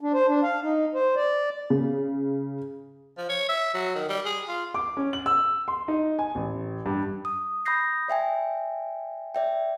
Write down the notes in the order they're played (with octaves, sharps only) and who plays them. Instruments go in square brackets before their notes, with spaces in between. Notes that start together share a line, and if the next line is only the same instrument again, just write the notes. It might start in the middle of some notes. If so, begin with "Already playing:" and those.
[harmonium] D4
C5
D4
F5
D#4
C5
D5
[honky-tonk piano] C#3
[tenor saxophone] F3
C#5
E5
F#3
D#3
G3
G#4
F4
[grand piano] D6
C#4
F#7
E6
C6
D#4
G#5
A1
G2
[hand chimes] D#6
B5 D#6 G6 A#6 C7
D5 E5 G5 G#5
D5 E5 G5